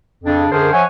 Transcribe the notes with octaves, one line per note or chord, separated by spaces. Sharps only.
F2 C#3 D4
F#2 D3 D4 G#4 A#4 C5
F3 C#5 E5 F#5 G#5